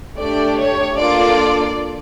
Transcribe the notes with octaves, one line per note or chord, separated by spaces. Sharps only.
A3 D4 G4 D5
C#5
A#3 D4 F4 A4 D5